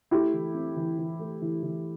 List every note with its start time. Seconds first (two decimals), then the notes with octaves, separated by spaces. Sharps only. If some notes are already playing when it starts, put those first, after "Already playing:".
0.11 A3 E4 G4
0.34 E3
0.55 C4
0.76 E3
0.98 E3
1.19 A3
1.42 E3
1.63 E3